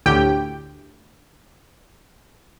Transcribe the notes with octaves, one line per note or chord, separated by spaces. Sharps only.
D2 A2 G4 G5